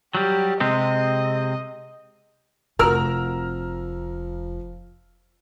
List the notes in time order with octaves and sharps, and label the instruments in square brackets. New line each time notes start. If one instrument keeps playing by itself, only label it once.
[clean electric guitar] F#3 G3 [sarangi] G4
[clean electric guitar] C3 G#3 C4 [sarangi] D#5
[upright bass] F1 C4 [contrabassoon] F3 [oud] F#4 A#4 [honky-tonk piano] A#5 E6 F6